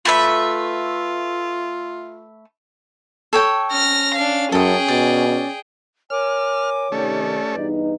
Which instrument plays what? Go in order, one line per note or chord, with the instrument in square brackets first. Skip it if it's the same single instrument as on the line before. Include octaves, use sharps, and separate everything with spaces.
[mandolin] A3 B4 E5 [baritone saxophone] F4
[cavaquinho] A4 C#5 G5
[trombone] C#4 [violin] F6 A#6
[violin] D4 F5
[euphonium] F#2 [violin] G#4 G5 [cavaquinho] A4 D#6
[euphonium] B2 [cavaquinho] D5
[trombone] C#4
[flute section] A#4 G#5 D6 [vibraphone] C#5 [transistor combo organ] F6
[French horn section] C3 D#3 [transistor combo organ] A3 C#4 [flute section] G4 D5
[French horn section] E2 G2 D#4 [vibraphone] B4